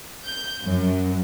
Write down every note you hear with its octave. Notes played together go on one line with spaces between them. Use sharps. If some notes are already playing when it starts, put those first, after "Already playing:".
G6
F#2